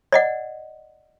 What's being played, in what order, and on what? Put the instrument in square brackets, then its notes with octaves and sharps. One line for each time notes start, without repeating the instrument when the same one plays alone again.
[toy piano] D5 D#5 F#5